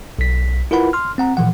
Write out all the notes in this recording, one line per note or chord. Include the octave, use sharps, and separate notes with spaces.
B1 B6
E4 F4 A#4 B4 F#5 B5
C6 F6
C4 F#5 A#5
A#2 E3 F3 F#5